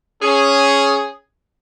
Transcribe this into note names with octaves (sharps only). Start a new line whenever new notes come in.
C#4 G#4